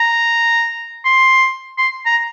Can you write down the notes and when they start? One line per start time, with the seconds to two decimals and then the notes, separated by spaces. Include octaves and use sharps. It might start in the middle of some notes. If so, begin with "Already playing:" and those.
Already playing: A#5
1.05 C6
1.78 C6
2.06 A#5